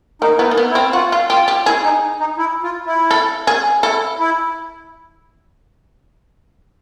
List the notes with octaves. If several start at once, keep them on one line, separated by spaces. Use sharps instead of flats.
A#3 D#4
B3 E4
D#4
A#3
B3
E4
C4
F4 F#4
F4
F4 G4
G4
E4 G#4
D#4
D#4
E4
F4
E4
A4
G#4
E4 A4
E4